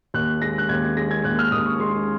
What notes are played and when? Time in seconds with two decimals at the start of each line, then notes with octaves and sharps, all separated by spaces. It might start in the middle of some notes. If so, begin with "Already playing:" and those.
0.14 D#2 F#6
0.42 G#3 A#6
0.58 F#6
0.69 D#2 G#6
0.97 G#3 A#6
1.11 G#6
1.24 D#2 F#6
1.39 F6
1.52 D#2 D#6
1.66 C#6
1.80 G#3 C6